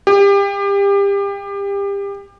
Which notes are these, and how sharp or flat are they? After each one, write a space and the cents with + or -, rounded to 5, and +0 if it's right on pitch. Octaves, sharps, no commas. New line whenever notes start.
G4 +30